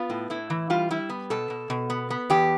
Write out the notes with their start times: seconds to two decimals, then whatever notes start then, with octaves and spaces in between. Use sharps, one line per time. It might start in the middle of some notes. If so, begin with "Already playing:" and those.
Already playing: B3 F4
0.10 A2
0.30 A2 E4
0.50 E3
0.70 G3 F4
0.91 G3 E4
1.10 B3
1.30 B2 A4
1.50 B2
1.70 B2
1.90 B3
2.10 B3
2.30 E2 G4